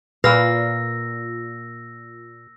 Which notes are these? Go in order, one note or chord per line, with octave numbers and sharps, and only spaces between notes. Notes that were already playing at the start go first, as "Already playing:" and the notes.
A#2 A#3 B4 F5 E6 A#6